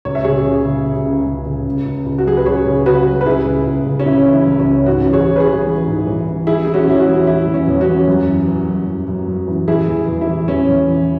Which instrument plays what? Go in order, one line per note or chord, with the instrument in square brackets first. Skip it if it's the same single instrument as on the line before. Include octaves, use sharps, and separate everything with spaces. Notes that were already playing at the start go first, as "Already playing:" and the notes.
[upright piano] C#2 C#5
E5
C#3 G#4 C#5
C#3
C#3
C#3
C#2
C#3
C#3
C#2
C#2
C#2
F#4
F#3 G#4
B4
C#2 G#4 C#5
C#3
C#3 F#4 B4
F#3
B4
C#2 E4 G#4
C#3
C#2
C#3
C#4
C#3 E4
E3
E4
C#2
C#4
C#2
G#2 C#4 F#4
E3
G#4 C#5
E3
B4
G#4 C#5
E3
E3
G#2
E3
E3
E3 E4 G#4
E3 G#4
C#4 F#4
E2 E4
C#4 F#4
E3
E3 E4
E2
C#4
E2
C#4 F#4
E3
F#2
E3
E3
F#2
F#2
F#2
F#2
E3
E3 E4 G#4
E2
E2
E4
E3
E2 C#4
E2
E3